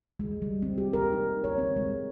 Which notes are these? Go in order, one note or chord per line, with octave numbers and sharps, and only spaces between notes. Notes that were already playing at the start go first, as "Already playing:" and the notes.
G#3
G3
C4
G4
A#4
D#4
C#5
C4
G#3